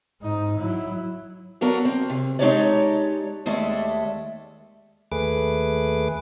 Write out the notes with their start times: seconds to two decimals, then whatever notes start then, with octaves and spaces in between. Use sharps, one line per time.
0.22 G#2 D#4
0.59 F#3 E4
1.61 F#3 B3 D4 A4 A#4
1.85 C4
2.10 C3
2.39 G#3 D4 D#4 G4 C#5 D5
3.46 D#2 G#3 A3 A4 D5 E5
5.12 D#2 A3 G#4 B4 D6